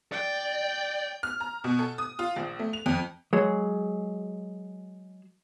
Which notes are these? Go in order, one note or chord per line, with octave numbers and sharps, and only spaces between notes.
D5 G5
F6
A#5
B2
A4
D#6
F4
A#1
A3
F7
F2
F#3 G#3